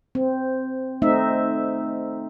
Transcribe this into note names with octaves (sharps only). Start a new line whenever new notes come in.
C4
A3 C4 D#4 E5